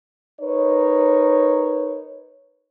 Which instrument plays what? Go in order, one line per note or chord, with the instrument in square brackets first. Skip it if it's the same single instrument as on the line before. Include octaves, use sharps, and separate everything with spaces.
[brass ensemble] D#4 A#4 B4 C#5